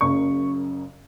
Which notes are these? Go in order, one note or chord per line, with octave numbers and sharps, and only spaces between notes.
F#1 F#2 C#3 C#6